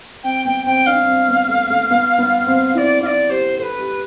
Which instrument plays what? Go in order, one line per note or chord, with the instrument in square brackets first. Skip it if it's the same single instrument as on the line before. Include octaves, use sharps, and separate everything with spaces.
[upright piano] C4 [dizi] G5
[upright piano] B3 [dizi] G5
[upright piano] C4 [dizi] G5
[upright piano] D4 [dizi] F5
[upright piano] C4
B3
A3
A3
B3
B3
C4
[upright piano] E4 [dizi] D5 F5
[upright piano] E4 [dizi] F5
[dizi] D5
[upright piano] G4 [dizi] C5
[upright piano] A4 [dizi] B4 C5
[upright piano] G4